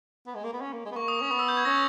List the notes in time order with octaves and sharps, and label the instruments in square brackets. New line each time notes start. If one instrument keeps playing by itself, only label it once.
[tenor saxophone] B3
G#3
A#3
B3
C#4
A#3
G#3
B3
[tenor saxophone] A#3 [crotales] C#6
[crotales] D#6
[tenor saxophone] C#4 [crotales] C#6
[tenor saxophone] B3 [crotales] D#6
[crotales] E6
G6
G#6
[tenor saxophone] C#4 [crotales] A#6